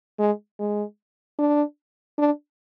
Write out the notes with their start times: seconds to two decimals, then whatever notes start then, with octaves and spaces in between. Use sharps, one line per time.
0.19 G#3
0.59 G#3
1.39 D4
2.18 D4